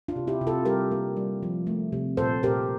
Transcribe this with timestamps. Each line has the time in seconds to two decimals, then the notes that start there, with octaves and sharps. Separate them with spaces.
0.08 D4 F4
0.16 C3
0.27 E4 G4
0.41 C3
0.47 F4 A4
0.65 G3 G4 A#4
0.91 A#3
1.17 G3
1.43 F3
1.67 A3
1.92 C3
2.17 A#2 A4 C5
2.43 A#2 G4 A#4